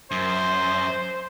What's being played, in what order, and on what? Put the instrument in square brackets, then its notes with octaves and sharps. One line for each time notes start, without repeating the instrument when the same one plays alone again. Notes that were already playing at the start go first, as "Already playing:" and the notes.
[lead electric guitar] F#2 [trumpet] C5